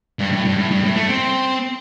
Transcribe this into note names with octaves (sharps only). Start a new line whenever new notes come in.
G2
A2
G2
A2
G2
A2
A3
C4